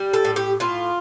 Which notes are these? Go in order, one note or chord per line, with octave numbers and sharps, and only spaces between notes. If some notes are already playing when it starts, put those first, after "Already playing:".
Already playing: G3
A4
A2
G4
A2 F4